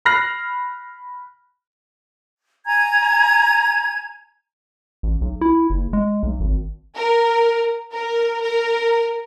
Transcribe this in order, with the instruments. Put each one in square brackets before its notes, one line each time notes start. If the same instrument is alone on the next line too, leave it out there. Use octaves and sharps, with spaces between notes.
[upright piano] B5 F6 F#6 A#6 C7
[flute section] G#5 A#5 G#6
[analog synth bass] A1
B1
E4
F#1
G#3
B1
G#1
[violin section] A#4
A#4
A#4